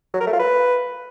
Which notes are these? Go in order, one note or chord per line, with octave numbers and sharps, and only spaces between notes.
F#3
A#4
A3
F4
B4